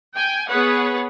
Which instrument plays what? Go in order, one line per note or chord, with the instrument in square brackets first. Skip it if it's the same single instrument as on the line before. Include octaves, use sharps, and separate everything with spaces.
[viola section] G5 G#5
B3 G#4 B4 C#5 F#5